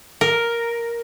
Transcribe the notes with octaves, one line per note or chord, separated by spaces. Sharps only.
A#4